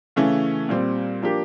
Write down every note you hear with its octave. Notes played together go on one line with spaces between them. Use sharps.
C#3 E3 A3 C#4
A#2 G3 C4
F3 A#3 D4 G4